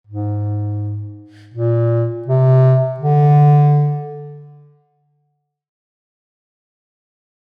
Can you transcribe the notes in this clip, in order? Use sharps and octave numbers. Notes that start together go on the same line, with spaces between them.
G#2
A#2
C3
D3